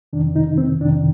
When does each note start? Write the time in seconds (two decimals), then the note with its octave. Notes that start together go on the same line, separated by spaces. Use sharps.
0.13 F2 C3 D#3 D4
0.36 D#4
0.58 C4
0.81 F2 C3 D#3 D4